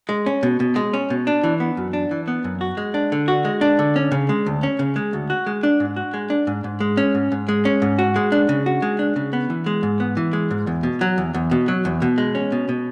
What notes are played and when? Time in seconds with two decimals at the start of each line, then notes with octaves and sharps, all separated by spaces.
0.09 G#3
0.26 C#4
0.43 B2
0.60 B2
0.76 G#3
0.94 C#4
1.10 B2
1.27 D4
1.44 E3
1.60 B3
1.77 F#2
1.93 D4
2.11 E3
2.28 B3
2.44 F#2
2.61 F#4
2.77 G#3
2.94 D4
3.12 D3
3.28 F#4
3.45 G#3
3.61 D4
3.79 D3
3.96 C#4
4.12 C#3
4.29 G#3
4.46 D2
4.63 C#4
4.79 C#3
4.96 G#3
5.13 D2
5.30 F#4
5.47 G#3
5.63 D4
5.80 G#2
5.96 F#4
6.14 G#3
6.30 D4
6.47 G#2
6.64 G#2
6.80 G#3
6.97 C#4
7.15 G#2
7.32 G#2
7.49 G#3
7.65 C#4
7.82 G#2
7.99 F#4
8.16 G#3
8.32 D4
8.49 C#3
8.66 F#4
8.82 G#3
8.99 D4
9.16 C#3
9.33 B3
9.50 E3
9.66 G#3
9.83 G#2
10.00 B3
10.17 E3
10.33 G#3
10.51 G#2
10.67 E2
10.83 B2
11.01 F#3
11.18 E2
11.34 E2
11.51 B2
11.68 F#3
11.85 E2
12.02 B2
12.18 G#3
12.35 C#4
12.52 B2
12.69 B2